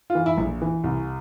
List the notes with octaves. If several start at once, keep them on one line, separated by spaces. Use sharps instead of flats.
F4
E3
E4
A#1
E3
C2